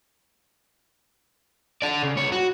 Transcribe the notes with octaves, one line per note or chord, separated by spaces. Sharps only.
A4 D5
C#3
C2 C#5
F#4